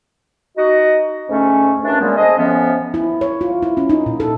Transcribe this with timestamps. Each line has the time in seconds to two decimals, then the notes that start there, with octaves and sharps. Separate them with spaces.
0.58 D#4 F#4 D#5
1.29 D2 G#2 A3 C#4
1.84 D#2 E3 C#4 D4
2.00 A#2 C#3 G3 G#3 A#3 B3
2.17 G#4 A4 C5 D#5
2.38 F2 A2 F3 B3 C#4
2.94 E4
3.21 C#5
3.41 F4
3.63 E4
3.77 C#4
3.90 D#4
4.06 A#2
4.20 A4